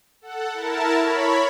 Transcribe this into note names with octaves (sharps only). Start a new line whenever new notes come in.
A4 F#5
E4 A#4 A5
C#5 B5